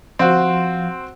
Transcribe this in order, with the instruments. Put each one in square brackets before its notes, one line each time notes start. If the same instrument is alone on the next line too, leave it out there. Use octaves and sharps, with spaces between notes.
[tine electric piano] F3 F5 C6 [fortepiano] C4 F#4